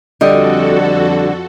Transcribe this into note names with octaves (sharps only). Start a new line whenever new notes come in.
F2 D3 G3 F#4 A4 D#5